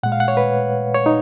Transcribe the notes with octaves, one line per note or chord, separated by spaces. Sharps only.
A#2 G#3 F#5
F5
F#5
C#5
B4
C#5
D#4